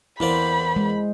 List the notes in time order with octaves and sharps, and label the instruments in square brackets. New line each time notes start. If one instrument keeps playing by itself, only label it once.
[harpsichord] E2 A#3 D5 [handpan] E4 C5 [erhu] B5
[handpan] G#3